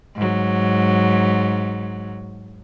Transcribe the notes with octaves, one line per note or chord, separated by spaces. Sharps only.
G#2 F#3